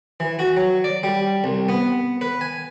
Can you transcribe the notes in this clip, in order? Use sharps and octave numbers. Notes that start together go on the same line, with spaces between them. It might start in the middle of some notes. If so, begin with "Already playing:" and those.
E3
F#4
F#3
D5
G3
C2
B3
B4
G#5